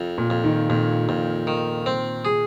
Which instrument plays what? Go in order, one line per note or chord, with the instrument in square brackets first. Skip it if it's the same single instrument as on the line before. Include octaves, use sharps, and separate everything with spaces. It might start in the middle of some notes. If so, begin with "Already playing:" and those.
Already playing: [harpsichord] F2
[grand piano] A#2
[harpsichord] F2
[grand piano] D#3
[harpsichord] F2 [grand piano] A#2
[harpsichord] F2 [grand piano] A#2
[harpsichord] D#3
C4
G#4